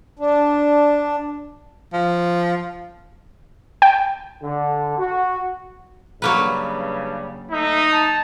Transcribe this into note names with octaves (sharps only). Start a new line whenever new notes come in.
D4
F3
G5
D3
F#4
G2 C#3 F#3 G3 A#3 B4
A3 D#4 E5
A5